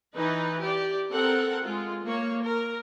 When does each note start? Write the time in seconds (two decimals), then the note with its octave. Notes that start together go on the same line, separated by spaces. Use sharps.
0.15 E3 D#4 B4
0.61 G4 D5
1.12 C4 A4 A#4 F#5
1.64 G#3 F4
2.04 A#3 C#5
2.42 A#4